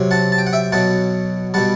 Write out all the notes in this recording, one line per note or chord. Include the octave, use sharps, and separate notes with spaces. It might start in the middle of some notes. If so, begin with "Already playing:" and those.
Already playing: C3 F#3
F#5 A5
A5
G5
F#5
E5 G5
B2 F#3 F#5 A5
B2 G3 F#5 A5